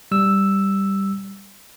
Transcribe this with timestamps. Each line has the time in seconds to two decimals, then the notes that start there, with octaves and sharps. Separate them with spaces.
0.11 G3 E6